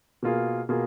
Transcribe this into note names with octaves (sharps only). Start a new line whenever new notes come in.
B2 A#3 F4 G#4
B2 A#3 F4 G#4